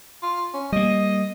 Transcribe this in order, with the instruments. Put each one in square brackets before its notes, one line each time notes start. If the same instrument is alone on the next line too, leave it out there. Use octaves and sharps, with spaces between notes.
[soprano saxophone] F4
C#4
[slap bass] G3 A#3 [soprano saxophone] D#5